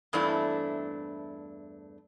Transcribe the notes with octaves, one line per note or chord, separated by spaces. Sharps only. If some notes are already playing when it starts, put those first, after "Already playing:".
E2 G2 A3 C4 D4 E4